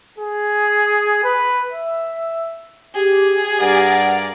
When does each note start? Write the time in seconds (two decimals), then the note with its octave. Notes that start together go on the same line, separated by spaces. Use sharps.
0.18 G#4
1.24 B4
1.72 E5
2.95 G4 G#4
3.60 G2 A#4 D5 F#5